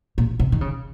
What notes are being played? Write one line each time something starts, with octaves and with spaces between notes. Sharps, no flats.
A#2
C3
D#3
C#3